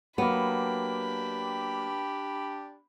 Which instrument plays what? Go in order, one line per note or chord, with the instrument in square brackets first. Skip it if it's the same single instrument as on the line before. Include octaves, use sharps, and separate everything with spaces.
[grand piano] F#3 A#3 [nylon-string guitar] B3 [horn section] D4 G4 [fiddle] B5